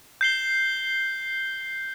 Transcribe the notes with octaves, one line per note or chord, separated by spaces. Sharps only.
G6 C7 G7